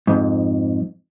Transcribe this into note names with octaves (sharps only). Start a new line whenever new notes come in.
F2 G#2